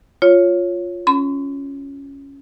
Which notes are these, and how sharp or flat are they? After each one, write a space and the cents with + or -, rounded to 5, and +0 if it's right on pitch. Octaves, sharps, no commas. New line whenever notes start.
F4 +0 C#5 +0
C#4 +0 C6 -45